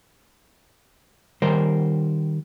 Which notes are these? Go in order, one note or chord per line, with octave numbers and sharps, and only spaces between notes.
D#3 G3 A#4 C5